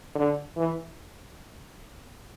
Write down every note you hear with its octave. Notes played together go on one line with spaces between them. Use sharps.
D3
E3